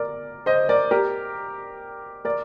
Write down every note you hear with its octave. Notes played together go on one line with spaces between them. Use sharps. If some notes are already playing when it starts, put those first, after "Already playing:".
Already playing: A#4 D5
C5 D#5
A#4 D5
G4 A#4
A#4 D5